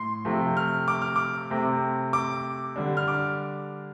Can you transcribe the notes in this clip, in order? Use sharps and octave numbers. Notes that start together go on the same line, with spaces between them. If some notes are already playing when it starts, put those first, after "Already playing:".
Already playing: A2 C6
C3 F3 A3 C4
F6
D6
F6
D6
C3 A3 C4
D6
D3 G3 D4
F6
D6